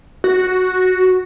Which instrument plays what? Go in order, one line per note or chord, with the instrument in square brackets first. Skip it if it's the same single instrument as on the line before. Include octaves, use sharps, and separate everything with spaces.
[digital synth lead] F#4